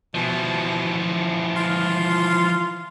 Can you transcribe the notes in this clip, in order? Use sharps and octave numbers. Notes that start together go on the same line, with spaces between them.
B2 E3 F3
F4